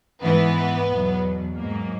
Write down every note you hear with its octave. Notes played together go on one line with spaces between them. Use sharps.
G#2 E3 B3
E2 B2 F#3
G#2 F#3 A#3